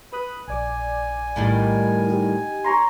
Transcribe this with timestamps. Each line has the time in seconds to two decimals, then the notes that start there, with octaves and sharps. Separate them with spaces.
0.13 B4 B5 D#6 F#6
0.48 A#1 D5 G#5 D6
1.36 A2 D#3 G3
2.09 D#4 G4 D#5
2.64 C#5 A#5 C6